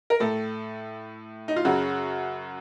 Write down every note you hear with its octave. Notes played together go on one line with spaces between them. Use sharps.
A#4
A2 A4
D#4
F4
F#2 C#3 F#4